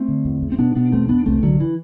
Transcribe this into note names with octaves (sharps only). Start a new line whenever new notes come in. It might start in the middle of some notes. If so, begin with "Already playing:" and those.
Already playing: A3 C4
D3
E2
E2
C4
B2 B3 D4
B2 B3 D4
E2 A3 C4
E2 B3 D4
C2 A3 C4
C2 D3 F#3
E3